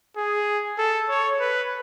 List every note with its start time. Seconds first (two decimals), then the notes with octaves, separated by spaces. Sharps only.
0.17 G#4
0.78 A4
1.09 C#5
1.40 B4